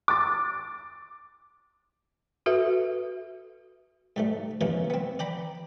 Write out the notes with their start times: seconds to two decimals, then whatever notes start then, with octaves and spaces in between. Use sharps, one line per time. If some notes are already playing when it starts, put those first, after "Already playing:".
0.08 D6 A6
2.46 F#4 A4 B4 E5
4.16 G#2 G3 A3
4.61 C3 E3 F3 G#3 A#3 C#4
4.90 B3 C4
5.19 D5 G5 A#5 B5